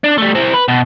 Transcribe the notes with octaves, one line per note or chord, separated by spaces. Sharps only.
D4
G3 A3
C4 E4
B4
B2